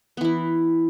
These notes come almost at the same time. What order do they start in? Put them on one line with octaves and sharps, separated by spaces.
B3 E3 E4